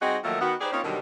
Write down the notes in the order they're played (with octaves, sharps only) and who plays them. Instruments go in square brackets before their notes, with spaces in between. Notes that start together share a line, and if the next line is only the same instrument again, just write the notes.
[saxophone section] G3 C4 D#4 F#4 G#4 D#5
D#3 F3 F#3 A3 A#3 D#5
D#3 B3 F#4
D#4 G4 G#4 B4 C5 D5
A#3 C4 C#4 D#4 F4 C#5
B2 D3 D#3 F#3 G3